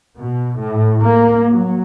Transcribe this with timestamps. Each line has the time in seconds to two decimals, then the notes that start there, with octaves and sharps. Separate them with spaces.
0.16 B2
0.59 A2
1.01 A#3
1.50 F#3